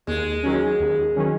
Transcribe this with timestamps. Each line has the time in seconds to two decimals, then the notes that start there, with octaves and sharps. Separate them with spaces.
0.07 D#2 G#3
0.43 D#3 F#3 C#4
0.79 D#2
1.16 D#3 F#3 C#4